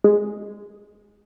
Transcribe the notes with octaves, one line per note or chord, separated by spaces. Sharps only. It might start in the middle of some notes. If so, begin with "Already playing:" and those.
G#3